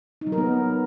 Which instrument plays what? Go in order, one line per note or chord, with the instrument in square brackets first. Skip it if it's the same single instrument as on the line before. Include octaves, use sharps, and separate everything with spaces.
[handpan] D#4
F#3
A#4
B3